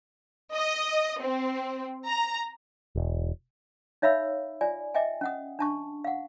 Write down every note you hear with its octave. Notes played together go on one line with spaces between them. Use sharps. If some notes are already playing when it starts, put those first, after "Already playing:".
D#5
C4
A#5
E1
D#4 C#5 E5 F5 B5 E6
F4 D5 G#5
D#5 E5 G5 G#5
C#4 F#5 D#6
D4 A5 C#6
F5 F#5